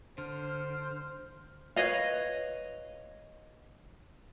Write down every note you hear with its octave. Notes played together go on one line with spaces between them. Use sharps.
D3 C5 F6
B4 C#5 D#5 F5